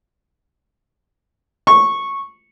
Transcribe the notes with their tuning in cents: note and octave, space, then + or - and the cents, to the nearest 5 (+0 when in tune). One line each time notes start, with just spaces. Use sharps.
C#6 -10